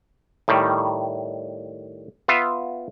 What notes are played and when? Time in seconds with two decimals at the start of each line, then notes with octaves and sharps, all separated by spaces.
0.48 A2 D#3 G3
2.28 B3 F4 E5